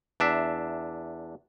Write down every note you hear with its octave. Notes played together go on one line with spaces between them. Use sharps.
E2 D4 E5